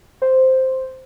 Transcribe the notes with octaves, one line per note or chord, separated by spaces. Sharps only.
C5